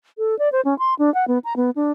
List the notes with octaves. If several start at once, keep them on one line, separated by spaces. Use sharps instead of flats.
A4
D5
C5
C#4
C6
D4
F#5
B3
A#5
B3
D4